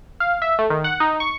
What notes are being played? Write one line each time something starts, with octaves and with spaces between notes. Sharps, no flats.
F5
E5
A3
D#3
F#5
D#4
C#6